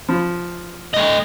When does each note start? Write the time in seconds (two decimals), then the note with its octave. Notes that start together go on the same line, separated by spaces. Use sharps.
0.09 F3
0.94 A3 D#5